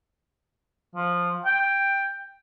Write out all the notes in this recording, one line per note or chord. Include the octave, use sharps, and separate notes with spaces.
F3
G5